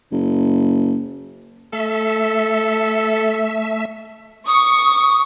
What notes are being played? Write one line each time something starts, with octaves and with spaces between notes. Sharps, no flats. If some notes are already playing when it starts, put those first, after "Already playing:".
F#1
A3 A4 E5
C#6 D#6